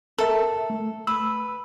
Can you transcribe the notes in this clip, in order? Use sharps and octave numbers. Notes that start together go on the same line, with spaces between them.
A4 A#4 E5
A3
B4 E6